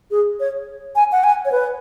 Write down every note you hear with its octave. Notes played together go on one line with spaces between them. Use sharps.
G#4
C#5
G#5
F#5
G#5
C#5
B4